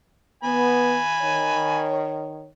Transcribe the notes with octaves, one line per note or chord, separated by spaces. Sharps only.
B3 G#5 B5
D#3 C#5